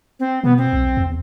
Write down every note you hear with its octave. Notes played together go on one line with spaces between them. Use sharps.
C4
B2 B3
C4
B1
E2